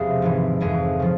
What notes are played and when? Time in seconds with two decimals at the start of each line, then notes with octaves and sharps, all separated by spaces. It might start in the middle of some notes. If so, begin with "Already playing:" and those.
Already playing: E1 E2 C3 F3 G#4 C5
0.22 G#1 G#2 E3
0.61 F1 F2 E3 G#4
1.00 C#3 F3